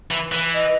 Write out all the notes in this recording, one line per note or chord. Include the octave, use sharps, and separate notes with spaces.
E3
E3
D#5